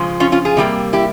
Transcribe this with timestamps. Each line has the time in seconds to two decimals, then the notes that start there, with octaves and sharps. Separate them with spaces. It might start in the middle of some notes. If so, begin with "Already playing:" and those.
Already playing: C#3 F3 G#3
0.20 C#4 F4
0.32 C#4 F4
0.45 F4 G#4
0.57 C3 G3 A#3
0.93 E4 G4